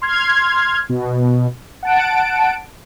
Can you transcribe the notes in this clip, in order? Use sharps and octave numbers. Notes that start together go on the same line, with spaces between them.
C6 F6 G#6
B2
F#5 A5 D7